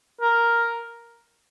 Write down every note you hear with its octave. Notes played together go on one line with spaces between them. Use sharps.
A#4